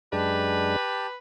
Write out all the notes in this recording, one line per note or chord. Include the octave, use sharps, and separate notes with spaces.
F#2 G#3 D4 G4 B4 A5